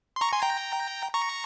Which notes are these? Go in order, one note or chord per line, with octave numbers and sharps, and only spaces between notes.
C6
A#5 C#6
G#5 C6
G5 A#5
A#5 C#6